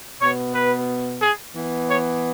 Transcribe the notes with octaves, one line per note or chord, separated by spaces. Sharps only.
B2 B3 C#5
B4
G#4
E3 B3
C#5